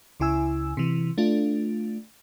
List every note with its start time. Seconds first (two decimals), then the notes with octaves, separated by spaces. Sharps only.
0.20 C#2 C#3 E4 G#5 E6
0.77 C3 E3
1.18 A3 D4 F4